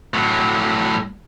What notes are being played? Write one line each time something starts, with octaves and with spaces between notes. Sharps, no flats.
A2 F#3